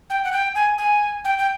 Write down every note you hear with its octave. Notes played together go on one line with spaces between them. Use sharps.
G5
F#5
G5
G#5
G#5
G5
G5